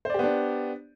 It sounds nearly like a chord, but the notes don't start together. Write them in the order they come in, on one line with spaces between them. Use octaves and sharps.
C5 D5 G4 B3 D4